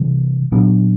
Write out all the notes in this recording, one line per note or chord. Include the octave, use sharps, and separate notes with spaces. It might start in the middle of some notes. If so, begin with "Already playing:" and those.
Already playing: C3 E3 G3
A#2 F#3 B3 D4